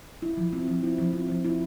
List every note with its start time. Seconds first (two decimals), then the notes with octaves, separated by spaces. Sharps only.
0.22 E4
0.37 F3
0.53 C4
0.68 F3
0.83 E4
0.98 F3
1.13 C4
1.28 F3
1.45 E4